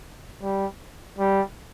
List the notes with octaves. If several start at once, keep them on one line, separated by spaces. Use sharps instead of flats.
G3
G3